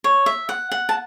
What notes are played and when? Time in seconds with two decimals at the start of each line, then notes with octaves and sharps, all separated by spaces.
0.04 C#5
0.26 E5
0.49 F#5
0.72 F#5
0.89 A5